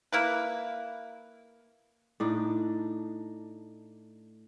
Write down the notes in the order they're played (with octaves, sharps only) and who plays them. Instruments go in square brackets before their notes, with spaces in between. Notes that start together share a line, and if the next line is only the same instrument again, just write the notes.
[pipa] A#3 E4 B4
[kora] A2 D4 D#4 G5